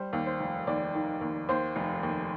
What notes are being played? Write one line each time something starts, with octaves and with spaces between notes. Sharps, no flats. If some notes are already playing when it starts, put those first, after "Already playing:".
Already playing: G3 C5
D#2
C5
F1
D#2 D5
D#3
D#2
D#2 C5
F1
D#2